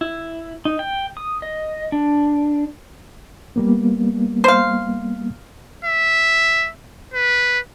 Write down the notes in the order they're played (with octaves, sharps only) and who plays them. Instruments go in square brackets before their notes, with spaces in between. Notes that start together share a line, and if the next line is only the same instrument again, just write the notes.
[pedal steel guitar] E4
D#4
G5
D#6
D#5
D4
[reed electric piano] G3 A#3 B3
[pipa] C5 F5
[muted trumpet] E5
B4